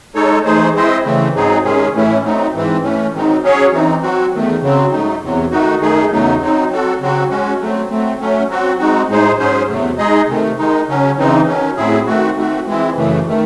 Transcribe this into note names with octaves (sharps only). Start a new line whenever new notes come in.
G#3 D#4 A4 C#5
E3 A3 D#4 G#4 C5
G#3 C4 E4 C5 D#5
C#3 E3 A3 C4
G#2 F#3 C4 D#4 G#4
C3 D#3 G#3 C#4 G#4
A2 E3 A3 C#4 E4
F#3 A3 C4 D#4
G#2 E3 C4
E3 A3 C#4
G#2 D#3 F#3 C4 D#4
F#3 C#4 G#4 C#5
E3 C4 D#4
F#3 C4 F#4
E2 D#3 A3
C#3 F#3 C4
G#2 F#3 A3 D#4
E2 C3 F#3
D#3 A3 D#4 F#4
F#2 D#3 A3 D#4 G#4
E2 C#3 F#3 A3 D#4
F#3 C4 D#4
F#3 C4 F#4 A4
C#3 F#3 C4 F#4
G#3 C#4 F#4
F#3 A3 C4
F#3 A3 C4
F#3 A3 C#4
F#3 C4 F#4
G#3 C4 D#4 F#4
A2 G#3 D#4 G#4 C5
G#2 F#3 C#4 G#4 C5
E2 C3 F#3 A3
G#3 D#4 G#4 D#5
C3 D#3 A3
D#3 G#3 D#4
C#3 F#3 C#4
C#3 E3 C4 D#4
D#3 F#3 C#4
A2 F#3 C4 E4 G#4
D#3 A3 C4 F#4
D#3 A3 C4 F#4
E3 G#3 C4 E4
F#2 C#3 E3 A3
D#3 A3